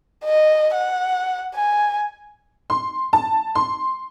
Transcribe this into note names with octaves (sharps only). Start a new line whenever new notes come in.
D#5
F#5
G#5
C6
A5
C6